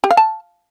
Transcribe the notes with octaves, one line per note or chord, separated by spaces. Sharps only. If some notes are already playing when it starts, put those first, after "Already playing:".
G4
F5
A5